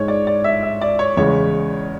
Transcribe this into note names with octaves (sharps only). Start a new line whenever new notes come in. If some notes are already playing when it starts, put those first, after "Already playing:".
Already playing: G#2 G#3 C#5
D5
D5
E5
E5
D5
C#5
E2 C#3 G#3 C#5